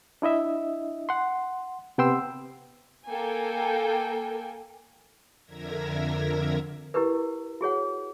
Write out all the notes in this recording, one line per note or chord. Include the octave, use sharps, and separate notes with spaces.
D4 E4 D#5 E5
F#5 C6
C3 B3 G5 C6 E6
A#3 A4 G5 G#5
F2 D3 A#4 E5 G#6 A#6
E4 G4 A#4 B4
F#4 G#4 C#5 F#5